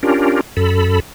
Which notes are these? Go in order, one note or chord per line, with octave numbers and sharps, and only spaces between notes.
C#4 D4 F4 G4 A#4
F#2 A4 B5